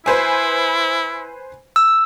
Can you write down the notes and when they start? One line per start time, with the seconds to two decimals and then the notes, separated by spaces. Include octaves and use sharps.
0.06 E4 B4 C5 G#5
1.76 E6